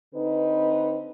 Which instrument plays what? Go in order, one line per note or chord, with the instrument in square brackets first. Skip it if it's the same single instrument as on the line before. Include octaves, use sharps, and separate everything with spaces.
[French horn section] D3 C4 D#4 B4